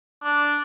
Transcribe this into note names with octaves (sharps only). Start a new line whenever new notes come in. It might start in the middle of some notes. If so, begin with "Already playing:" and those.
D4